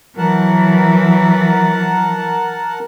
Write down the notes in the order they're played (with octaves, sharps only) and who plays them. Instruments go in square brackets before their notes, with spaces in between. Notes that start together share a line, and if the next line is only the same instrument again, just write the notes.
[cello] E3 [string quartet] F#3 [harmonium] A#4 F#5 A5